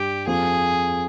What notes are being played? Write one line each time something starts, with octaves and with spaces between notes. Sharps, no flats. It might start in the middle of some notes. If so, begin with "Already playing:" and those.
Already playing: G2 G3 G4
F2 F3 G#4